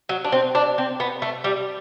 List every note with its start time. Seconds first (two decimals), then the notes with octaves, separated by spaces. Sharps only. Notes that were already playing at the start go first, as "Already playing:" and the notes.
0.09 F#3
0.25 D4
0.32 C4
0.55 D4
0.78 C4
1.00 B3
1.22 A3
1.44 G3